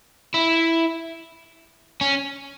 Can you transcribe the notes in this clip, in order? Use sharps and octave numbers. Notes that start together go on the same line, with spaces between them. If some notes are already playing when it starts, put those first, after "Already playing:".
E4
C#4